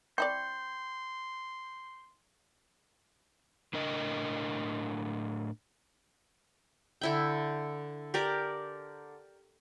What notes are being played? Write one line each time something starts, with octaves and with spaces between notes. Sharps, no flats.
C4 E4 D5 G5 C6 C#6 G6
A2 D4 A#4 D#5
D3 E4 G5
G4 A#4 D5